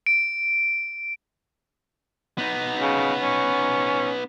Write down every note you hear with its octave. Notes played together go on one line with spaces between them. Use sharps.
D7
B3 D#4
C#3
C#4